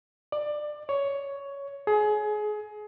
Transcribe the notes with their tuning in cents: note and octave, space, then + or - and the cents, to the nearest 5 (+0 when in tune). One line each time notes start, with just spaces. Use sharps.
D5 +20
C#5 +10
G#4 +25